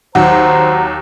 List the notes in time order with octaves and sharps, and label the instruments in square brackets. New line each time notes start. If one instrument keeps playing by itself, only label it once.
[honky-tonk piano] D#2 F#3 [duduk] C5 [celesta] F#5 [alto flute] A#5